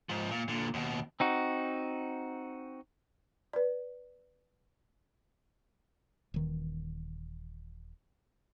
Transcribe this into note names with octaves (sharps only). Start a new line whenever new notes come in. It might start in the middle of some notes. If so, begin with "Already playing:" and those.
G#2 F3
A#2
A#2 D3
D#2 B2
C4 D#4 F#4
B4 D5
D#1 D#3 E3